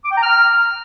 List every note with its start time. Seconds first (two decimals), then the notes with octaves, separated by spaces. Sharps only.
0.05 D6
0.11 G5
0.17 A#5
0.23 F6